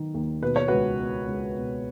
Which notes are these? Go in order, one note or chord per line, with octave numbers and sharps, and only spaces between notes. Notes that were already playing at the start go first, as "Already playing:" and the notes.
Already playing: D#3 F#3 B3
D#2
B2 B4
C#5
C#2 F#4 B4
B3
C#2
B2